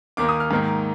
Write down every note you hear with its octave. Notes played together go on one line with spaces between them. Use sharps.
D#2 D#3 A#3 D6
D#6
F6
G#2 D#3 A#3